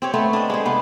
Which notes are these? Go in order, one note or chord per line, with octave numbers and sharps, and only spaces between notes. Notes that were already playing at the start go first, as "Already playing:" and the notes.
C4 G4 C#5
A3 B3 C4 C#5
D4 D#5
G#3 G4 G#4
C3 B3